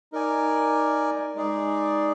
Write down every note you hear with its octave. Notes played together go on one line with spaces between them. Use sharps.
D#4 A#4 D5 G#5
G#3 D#4 G#4 D5